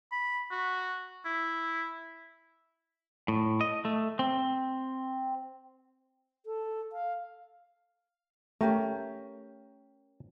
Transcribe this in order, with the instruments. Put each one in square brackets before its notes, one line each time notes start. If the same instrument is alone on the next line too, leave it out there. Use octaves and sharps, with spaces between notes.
[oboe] B5
F#4
E4
[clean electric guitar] A2
D#5
A3
C4
[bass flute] A4
F5
[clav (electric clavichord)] A3 [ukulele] C#4 G4 A#4